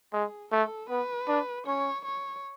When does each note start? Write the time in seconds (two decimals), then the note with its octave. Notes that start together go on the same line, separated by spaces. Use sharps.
0.13 G#3 G#4
0.52 A3 A4
0.90 B3 B4
1.28 D4
1.66 C#4 C#5
2.05 C#5